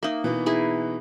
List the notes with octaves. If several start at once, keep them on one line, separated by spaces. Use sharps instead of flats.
A#3 D#4 E5
B2 E3 B3
D#4 E4 G#4